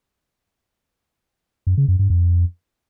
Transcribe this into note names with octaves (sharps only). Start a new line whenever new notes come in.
F#2
C#3
F#2
G2
F2